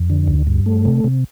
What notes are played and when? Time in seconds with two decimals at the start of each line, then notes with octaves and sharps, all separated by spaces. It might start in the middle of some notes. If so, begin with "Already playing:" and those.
Already playing: F2
0.10 D3
0.28 D2
0.47 G2
0.66 A3
0.85 C3
1.04 C3